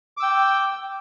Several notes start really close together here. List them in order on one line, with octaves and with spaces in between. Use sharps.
D6 E6 G5